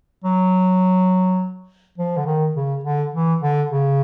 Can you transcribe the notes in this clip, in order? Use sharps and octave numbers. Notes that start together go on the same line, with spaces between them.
F#3
F3
D3
D#3
C#3
D3
E3
D3
C#3